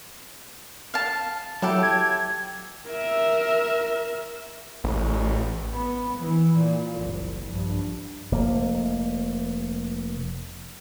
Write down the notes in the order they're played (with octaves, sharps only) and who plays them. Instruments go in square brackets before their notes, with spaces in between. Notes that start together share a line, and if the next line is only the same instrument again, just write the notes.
[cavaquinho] F5 A5
[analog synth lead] F#3 [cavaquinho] E4 G4 A4
[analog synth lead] G#6
[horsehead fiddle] A#4 E5
[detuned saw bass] A1
[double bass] B3
E3
A#2
F#1 C2
A#1 G2
[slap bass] F1 A#3